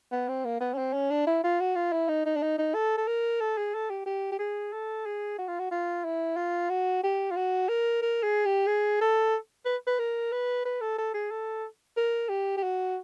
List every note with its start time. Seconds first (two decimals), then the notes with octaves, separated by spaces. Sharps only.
0.12 B3
0.28 C4
0.45 A#3
0.60 B3
0.74 C#4
0.78 C4
0.93 C#4
1.11 D4
1.27 E4
1.44 F4
1.60 F#4
1.75 F4
1.92 E4
2.08 D#4
2.25 D#4
2.36 D4
2.42 D#4
2.58 D#4
2.74 A4
2.97 A4
3.07 A#4
3.40 A4
3.57 G#4
3.74 A4
3.90 G4
4.06 G4
4.32 G4
4.39 G#4
4.73 A4
5.05 G#4
5.38 F#4
5.48 F4
5.59 F#4
5.71 F4
6.04 E4
6.36 F4
6.69 F#4
7.03 G4
7.31 F4
7.36 F#4
7.68 A#4
8.02 A#4
8.23 G#4
8.45 G4
8.67 G#4
9.01 A4
9.65 B4
9.87 B4
9.99 A#4
10.32 B4
10.65 B4
10.81 A4
10.98 A4
11.14 G#4
11.30 A4
11.97 A#4
12.29 G4
12.57 G4
12.63 F#4